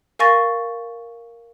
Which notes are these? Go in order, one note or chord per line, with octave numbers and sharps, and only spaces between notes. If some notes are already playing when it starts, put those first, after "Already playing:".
A#4 F5 G#5 C#6 A6 A#6